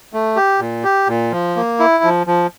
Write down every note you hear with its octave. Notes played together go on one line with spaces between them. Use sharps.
A3
G4
A#2
G4
A#2
F3
A#3
E4
F3
F3